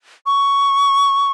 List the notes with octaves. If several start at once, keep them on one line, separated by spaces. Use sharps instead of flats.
C#6